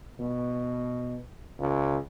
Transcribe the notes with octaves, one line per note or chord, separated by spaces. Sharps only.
B2
C#2